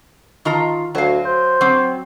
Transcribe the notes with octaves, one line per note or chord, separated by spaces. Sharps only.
D#3 F4 A#5
D2 F#3 F5
C5
F#3 C4